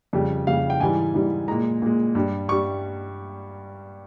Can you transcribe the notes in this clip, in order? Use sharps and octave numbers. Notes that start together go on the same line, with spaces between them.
F2 C#3 G3
F2 C#3 G3 F5
G5
G#2 E3 G3 G#5
G#2 E3 G3
A#2 G#3 A#5
A#2 G#3
G2 G3
G2 G3 C#6